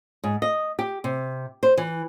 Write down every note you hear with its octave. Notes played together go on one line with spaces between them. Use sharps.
G#2
D#5
G4
C3
C5
E3